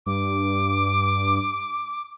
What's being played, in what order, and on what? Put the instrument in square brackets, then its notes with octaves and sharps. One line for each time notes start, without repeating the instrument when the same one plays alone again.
[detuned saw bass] G2 [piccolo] D6